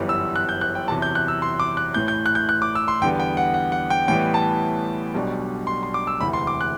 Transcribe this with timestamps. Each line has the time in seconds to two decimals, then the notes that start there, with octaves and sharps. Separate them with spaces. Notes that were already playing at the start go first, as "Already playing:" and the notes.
Already playing: G1 F#2 E3 G3 B3
0.09 E6
0.36 F#6
0.49 G6
0.61 F#6
0.75 G5
0.88 E2 C3 F#3 A5
1.02 G6
1.15 F#6
1.28 E6
1.42 C6
1.60 D6
1.77 F#6
1.94 A1 A2 E3 G6
2.08 G6
2.26 F#6
2.35 G6
2.49 F#6
2.62 D6
2.75 E6
2.88 C6
3.01 E2 D3 G3 B3 G5
3.20 G5
3.37 F#5
3.54 F#5
3.72 F#5
3.90 G5
4.08 A1 A2 E3 G3 B3 G5
4.34 A5
5.14 B1 B2 G3 D4
5.67 C6
5.83 C6
5.94 D6
6.07 E6
6.20 E1 D2 C3 E3 B5
6.33 C6
6.47 D6
6.61 F#6